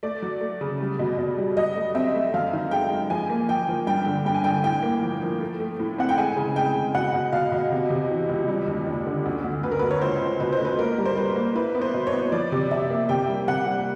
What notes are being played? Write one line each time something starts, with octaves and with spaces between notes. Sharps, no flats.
A3 D5
F#3
A3
C#3
G3
B2
B2
G3
F#3 D#5
A3
C4 E5
A3
F#2 F5
D#3
G#3 G5
G#3
F3 G#5
A#3
F3 G5
F3
G2 G5
D3
G2 G5
G#5
D3 G5
A2 G5
A#3
F3
F3
A3
A3
A2
C4 F#5
G5
G#3 G#5
C#3
G#3 G5
C#3
B2 F#5
B2
B2 F5
B2
C3
C3
E3
C#2
G3
D#2
D#2
D3
D2
D2
D2 B4
A#4
D2 B4
C#5
C#2 C5
C#2
B2 B4
C5
A3
B4
A#3 A#4
G3
C5
G3 B4
A#3
E4 B4
B3
C5
B2
C#5
B3
F3 D5
C3
C3 E5
A#3
C3 G5
G3
C3 F#5
G3